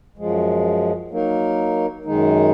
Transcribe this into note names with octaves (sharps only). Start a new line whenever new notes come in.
F#2 F3 G#3
F#3 A#3 D#4 A#4
F#2 D#3 G#3 D#4